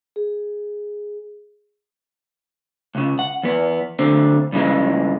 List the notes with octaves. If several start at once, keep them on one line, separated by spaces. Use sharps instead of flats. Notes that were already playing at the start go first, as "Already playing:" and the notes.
G#4
C#2 C#3
F#5
E2 B3
D2 D3 C4
G2 C#3 E3 G#3